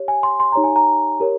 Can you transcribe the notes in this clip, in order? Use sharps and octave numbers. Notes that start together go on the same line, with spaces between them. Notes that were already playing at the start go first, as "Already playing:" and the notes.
Already playing: G4 C#5
G#5
C6
C6
D#4 G4 C#5 A#5
G#5
A#5
G4 A#4 C#5